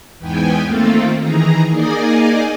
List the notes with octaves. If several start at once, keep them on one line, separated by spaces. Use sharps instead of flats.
E2 G#2 B3 G5 G#5
D#3 A3 A#3 C4 F4 A4
D#3 E3 G#4 A#5
A#3 D#4 G#4 D5 D#5 G#5